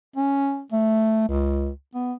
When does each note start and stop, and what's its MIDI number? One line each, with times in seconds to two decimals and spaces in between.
0.16 0.62 61
0.72 1.25 57
1.28 1.69 37
1.94 2.13 59